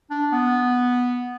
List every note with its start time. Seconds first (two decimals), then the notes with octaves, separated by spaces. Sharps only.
0.10 D4
0.32 B3